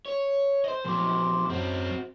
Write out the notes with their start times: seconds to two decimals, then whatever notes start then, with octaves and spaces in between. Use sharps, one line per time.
0.06 C#5
0.64 C5 D#5
0.85 A#2 F3 F#3 C6 D6
1.50 F#2 F#3 C4 F#4